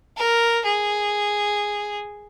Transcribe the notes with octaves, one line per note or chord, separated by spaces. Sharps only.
A#4
G#4